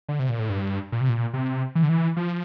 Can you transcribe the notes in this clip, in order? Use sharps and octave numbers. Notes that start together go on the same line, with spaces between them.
D3
C3
A#2
A2
G2
A#2
C3
A#2
C3
E3
D3
E3
F3